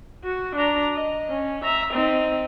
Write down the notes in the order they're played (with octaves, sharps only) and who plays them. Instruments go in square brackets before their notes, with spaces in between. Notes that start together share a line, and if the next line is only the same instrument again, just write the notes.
[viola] F#4
D4 A#5
D#5
C#4
E5 A#5
C4 D#4